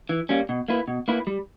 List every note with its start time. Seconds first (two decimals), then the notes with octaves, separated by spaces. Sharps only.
0.09 E3
0.29 G3 A#3 C#4
0.49 B2
0.68 A#3 E4 B4
0.88 B2
1.08 A#3 E4 B4
1.27 G3